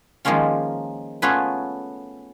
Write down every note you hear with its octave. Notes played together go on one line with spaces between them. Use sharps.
D#3 F3 G#3 A#3 C#4 F4
A3 B3 C#4 F4 G#4 B4